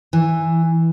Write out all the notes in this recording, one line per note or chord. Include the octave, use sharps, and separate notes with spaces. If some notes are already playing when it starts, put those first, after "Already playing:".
E3